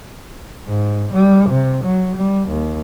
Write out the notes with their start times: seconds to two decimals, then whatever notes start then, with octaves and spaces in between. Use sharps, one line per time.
0.67 G#2
1.13 G3
1.49 C3
1.85 F#3
2.16 G3
2.49 D#2